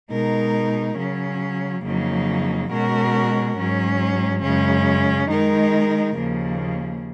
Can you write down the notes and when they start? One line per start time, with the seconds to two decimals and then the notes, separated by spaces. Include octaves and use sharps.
0.11 B2 G#3 D#4 A#4
0.97 C#3 F#3 C#4
1.83 F2 C#3 F#3 A#3 D#4
2.71 B2 G#3 C#4 F#4 A#4
3.57 G#2 F#3 C#4
4.43 F#2 C#3 G#3 C#4
5.30 D#3 G#3 D#4 A#4
6.16 D#2 C#3 F3 A#3